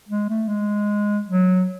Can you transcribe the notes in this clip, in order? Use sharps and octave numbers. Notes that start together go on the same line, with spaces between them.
G#3
A3
G#3
F#3